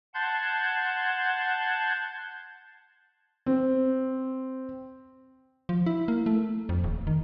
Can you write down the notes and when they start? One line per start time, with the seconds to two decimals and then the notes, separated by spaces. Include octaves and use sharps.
0.14 F#5 A5 C6 G6 G#6
3.46 C4
5.69 F3
5.86 E4
6.08 A#3
6.26 A3
6.69 F2
6.84 D#1
7.07 D#3